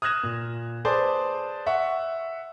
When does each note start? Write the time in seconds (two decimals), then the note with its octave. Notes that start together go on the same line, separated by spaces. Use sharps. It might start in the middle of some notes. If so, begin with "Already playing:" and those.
0.02 D#6 F6 F#6 G#6 A#6 E7
0.23 A#2
0.85 G#4 B4 C5 D5 A5
1.66 E5 F#5 C#6